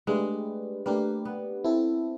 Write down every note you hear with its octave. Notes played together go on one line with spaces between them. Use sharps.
G#3 A3 D4 G4 B4
A3 A#3 D4 G4 B4
B3
C4 E4 A4